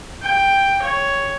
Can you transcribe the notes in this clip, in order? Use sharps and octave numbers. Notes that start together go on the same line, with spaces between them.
G5
C#5